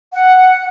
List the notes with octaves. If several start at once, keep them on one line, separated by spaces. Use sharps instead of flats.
F#5